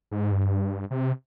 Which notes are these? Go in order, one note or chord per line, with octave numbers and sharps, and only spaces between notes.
G#2
G2
C3